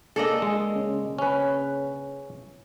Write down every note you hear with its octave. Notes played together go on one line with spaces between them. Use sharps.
A#3 D4 G#4 A4 D5 D#5
G#3
C#3
C#4 B4